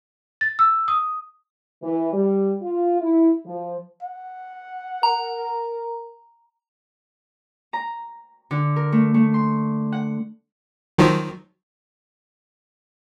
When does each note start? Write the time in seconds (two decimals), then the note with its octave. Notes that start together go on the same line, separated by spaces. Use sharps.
0.41 A6
0.59 E6
0.88 D#6
1.83 E3
2.13 G3
2.62 F4
3.01 E4
3.46 F3
4.03 F#5
5.03 A#4 A#5
7.73 A#5
8.51 D3
8.76 A#4
8.92 A3
9.14 A3
9.34 C6
9.92 F#5
10.98 D#3 F3 F#3